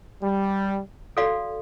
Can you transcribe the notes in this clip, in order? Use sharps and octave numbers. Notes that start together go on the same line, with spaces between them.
G3
F#4 A4 D5 F5